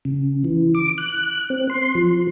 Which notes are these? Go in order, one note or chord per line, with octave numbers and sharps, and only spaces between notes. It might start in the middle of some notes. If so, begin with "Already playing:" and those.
C#3
E3
D6
F#6
C4
C6
F3